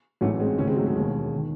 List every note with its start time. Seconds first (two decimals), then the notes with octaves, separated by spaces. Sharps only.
0.21 A1 G#2 E3 F#3 A3
0.40 G#3 C4
0.58 C#2 C3 D#3 A3 C#4
0.67 G#3 C4
0.76 F#3 A3
0.87 G#3
0.95 E1 D#2 D#3
1.36 D#3